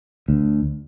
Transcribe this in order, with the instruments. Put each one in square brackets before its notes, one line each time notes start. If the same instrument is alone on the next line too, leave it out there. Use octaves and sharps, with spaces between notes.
[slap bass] D2